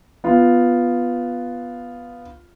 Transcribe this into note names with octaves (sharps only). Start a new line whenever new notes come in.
B3 F4